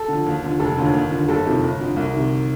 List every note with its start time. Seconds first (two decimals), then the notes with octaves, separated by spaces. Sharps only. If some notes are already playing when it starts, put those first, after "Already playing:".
Already playing: A4
0.08 D3 F3
0.26 D#2
0.44 D3 F3
0.60 F1 A4
0.77 D#2 D3 F3
0.94 D#2
1.11 D3 F3
1.28 G1 A4
1.46 F2 C3 D#3
1.63 G1
1.80 F2 D3
1.96 C2
2.13 C3 D#3